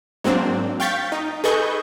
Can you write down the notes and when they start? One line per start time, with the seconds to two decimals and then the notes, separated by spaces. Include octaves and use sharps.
0.24 G#2 F#3 A#3 C4 D4
0.80 F5 G5 C#6 G6 A6 B6
1.12 D#4
1.44 G#4 A4 B4 D#5 C#6 G6